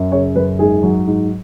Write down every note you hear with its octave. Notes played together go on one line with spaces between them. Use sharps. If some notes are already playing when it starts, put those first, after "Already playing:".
Already playing: F#2
C#3 C#5
F#2 B4
G#2 G#4
F#3
G#2